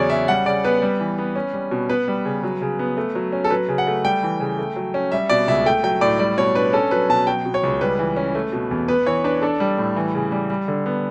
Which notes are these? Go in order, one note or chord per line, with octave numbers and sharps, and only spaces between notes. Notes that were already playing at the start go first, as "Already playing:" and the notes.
Already playing: E2 C#3 F#3 C#5 D5
C#4 E5
G3 F#5
C#3 D5
B3 B4
G3
E3
B3
C#4
G3
B2
B3 B4
G3
C#3
F#3
C#3
B3
A3
F#3
C#4
A4
F#3 B4
C#3
F#5
A3
G3 G5
E3
C#3
A3
F#3
C#4
G3 E5
B2 D5
C#2 E5
A3 G5
F#3 G5
A2 D5
G3 D5
B2 C#5
D4 B4
C#4 A4
F#3 B4
B2 A5
F#3 G5
B2
C#5
C#2
G3 B4
E3
C#4
A3
B2
E2
B3 B4
E3 C#5
D4 B4
D4 A4
G3
A2
E3
C#3
G3
G3
D3
B3